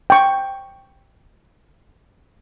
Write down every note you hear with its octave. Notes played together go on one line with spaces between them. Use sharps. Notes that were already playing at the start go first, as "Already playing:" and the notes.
G5 C#6